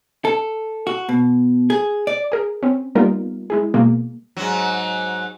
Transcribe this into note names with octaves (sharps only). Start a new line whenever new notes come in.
A4
F#4
B2
G#4
D5
G#4 A#4
C4 C#4
G3 A#3 B3 D#4 F4 A#4
G#3 E4 G#4
B2 G#3 A#3
G#2 F#3